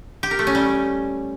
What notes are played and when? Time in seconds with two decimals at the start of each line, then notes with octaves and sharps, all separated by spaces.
0.23 G4
0.31 A#4
0.39 A3
0.47 C#4
0.55 G3